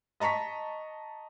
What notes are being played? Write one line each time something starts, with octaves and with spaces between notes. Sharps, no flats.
D#5 A5 A#5 C#6 B6